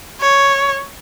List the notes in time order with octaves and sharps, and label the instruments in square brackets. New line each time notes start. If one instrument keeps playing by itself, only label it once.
[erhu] C#5